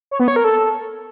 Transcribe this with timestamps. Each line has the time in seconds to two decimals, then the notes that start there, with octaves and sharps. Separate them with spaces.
0.11 C#5
0.20 B3
0.28 C#5
0.36 A#4
0.44 A4